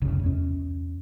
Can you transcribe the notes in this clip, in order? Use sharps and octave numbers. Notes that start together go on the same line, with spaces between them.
F1 C2 C#3
E2 C#4